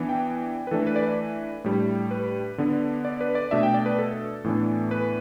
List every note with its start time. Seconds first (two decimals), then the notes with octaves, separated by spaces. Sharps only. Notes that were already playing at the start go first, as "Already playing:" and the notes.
Already playing: E3 B3 D4
0.09 G5
0.67 B4
0.71 E3 A3 D4 A4
0.87 B4
0.96 D5
1.03 B4
1.64 A2 G3 D4
2.11 B4
2.58 D3 B3 D4
3.05 D5
3.21 B4
3.35 D5
3.51 B2 A3 D4 E5
3.63 G5
3.74 D5
3.86 B4
3.99 A4
4.44 A2 E3 B3 D4
4.91 B4